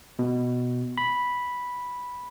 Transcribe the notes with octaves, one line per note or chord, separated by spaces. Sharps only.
B2
B5